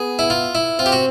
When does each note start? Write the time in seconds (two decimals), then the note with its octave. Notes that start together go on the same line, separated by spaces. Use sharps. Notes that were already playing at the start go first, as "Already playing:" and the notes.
Already playing: B3 G#4
0.19 E4
0.30 F4
0.55 E4
0.79 C4 F4
0.86 G4
0.92 F#4